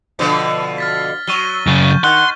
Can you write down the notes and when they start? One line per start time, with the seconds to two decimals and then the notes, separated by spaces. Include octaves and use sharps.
0.19 B2 D3 F3
0.78 F6 A6 B6
1.27 F#3 C#6 D#7 G7
1.67 F#2 C#3
1.91 G6
2.04 D#3 F#5 C6